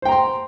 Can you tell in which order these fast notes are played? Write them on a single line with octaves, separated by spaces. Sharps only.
C5 G5 A#5 C6